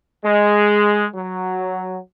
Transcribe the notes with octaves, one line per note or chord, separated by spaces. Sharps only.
G#3
F#3